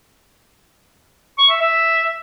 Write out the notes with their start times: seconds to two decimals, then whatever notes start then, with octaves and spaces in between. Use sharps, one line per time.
1.38 C#6
1.50 E5
1.61 E5